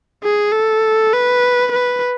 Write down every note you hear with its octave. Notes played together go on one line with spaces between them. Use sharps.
G#4
A4
B4
B4